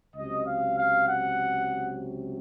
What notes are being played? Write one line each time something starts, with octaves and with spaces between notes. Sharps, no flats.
C#2 C3 F#3 D#5
F5
F5
F#5